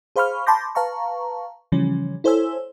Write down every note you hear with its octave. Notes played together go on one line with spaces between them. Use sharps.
G#4 C5 F5 B5 C#6 F6
A5 B5 C6 D6 G6 A#6
B4 F5 A5 A#5 C#6
C#3 E3 F3 G3 C#4
E4 A4 C5 C#5 G#5 E6